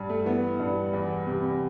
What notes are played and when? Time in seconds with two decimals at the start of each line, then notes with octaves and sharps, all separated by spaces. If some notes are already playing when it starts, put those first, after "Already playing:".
Already playing: G2
0.09 A3
0.26 E3 B3
0.60 G2
0.93 E2
1.27 C3